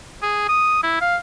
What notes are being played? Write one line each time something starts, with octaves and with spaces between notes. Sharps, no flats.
G#4
D#6
E4
F5